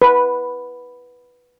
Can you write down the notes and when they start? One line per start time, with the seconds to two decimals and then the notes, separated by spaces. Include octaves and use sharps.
0.02 B4